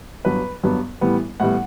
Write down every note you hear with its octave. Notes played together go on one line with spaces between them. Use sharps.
G2 F#3 B3 B4
G2 F#3 B3
A2 E3 G3 B3
A2 E3 G3 B3 F#5